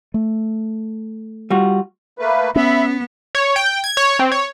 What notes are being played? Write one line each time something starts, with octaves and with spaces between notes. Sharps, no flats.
A3
G3 F4 F#4
A3 A#3 B4
B3 C#4 E5 B5
C#5
G5
G#6
C#5
C4
C#5